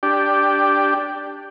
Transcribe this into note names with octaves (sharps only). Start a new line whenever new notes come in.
D4 G4